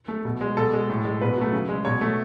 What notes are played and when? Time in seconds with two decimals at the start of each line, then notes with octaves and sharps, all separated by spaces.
0.08 A3
0.25 B2
0.41 G#3
0.57 B2 A4
0.73 G#3
0.90 A2
1.05 G#3
1.21 B2 B4
1.37 F#3 A3
1.53 C#3
1.69 G#3
1.85 B2 C#5
2.01 A3